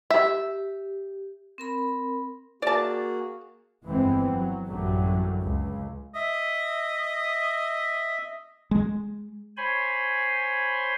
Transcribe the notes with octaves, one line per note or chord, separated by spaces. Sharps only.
G4 E5
C4 A#4 B5
A#3 F#4 G#4 D5 A5
G1 F2 E3 G#3 B3 C4
F#3
A1 F#2 D3 F#3 G3 A3
C#2
D#5 E5
G#3
C5 C#5 G#5 B5 C6